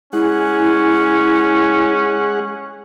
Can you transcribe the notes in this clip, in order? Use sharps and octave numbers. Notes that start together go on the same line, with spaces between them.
G#3 C#4 E4 G#4 F#5